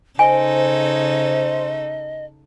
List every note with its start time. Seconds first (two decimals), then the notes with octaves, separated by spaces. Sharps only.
0.19 C#3 D#4 A4 C5 D#5 G#5